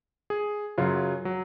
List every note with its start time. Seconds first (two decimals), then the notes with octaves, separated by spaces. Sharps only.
0.30 G#4
0.78 F#2 C#3 F#3 F4
1.25 F#3